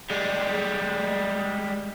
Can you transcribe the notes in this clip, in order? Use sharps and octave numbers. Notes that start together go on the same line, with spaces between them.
G3 G#3